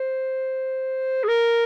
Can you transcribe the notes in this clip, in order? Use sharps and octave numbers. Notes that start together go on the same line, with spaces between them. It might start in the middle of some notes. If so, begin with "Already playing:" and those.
Already playing: C5
G#4
A#4